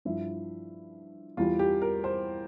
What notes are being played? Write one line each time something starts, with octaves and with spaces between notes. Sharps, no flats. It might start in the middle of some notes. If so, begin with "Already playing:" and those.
G2 F3 E4
E2 E3 G3 F4
G4
A#4
C5